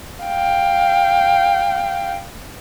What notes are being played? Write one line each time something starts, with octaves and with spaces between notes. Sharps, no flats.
F5 G5